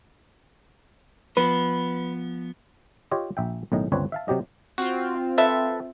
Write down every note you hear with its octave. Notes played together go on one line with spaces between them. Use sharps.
F3 B3 B4
F4 G4 C#5 D#5
A#1 E5 G5
B1 A2 D#3 D#5
G1 C#2 C4 D4 B4 C#5
E5 F5 A5
C3 F#3 G4 D#5
C4 F4 F#4
A4 B4 E5